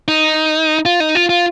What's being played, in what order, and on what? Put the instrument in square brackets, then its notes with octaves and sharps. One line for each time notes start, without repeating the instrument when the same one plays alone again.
[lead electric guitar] D#4
F4
D#4
F4
F4